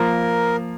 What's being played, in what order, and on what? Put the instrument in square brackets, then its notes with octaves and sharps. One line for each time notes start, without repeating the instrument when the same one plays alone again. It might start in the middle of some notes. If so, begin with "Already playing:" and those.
Already playing: [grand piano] F3 A#3 F4 [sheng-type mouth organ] A#4